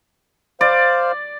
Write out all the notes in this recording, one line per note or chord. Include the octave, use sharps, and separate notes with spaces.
C5 D5 F5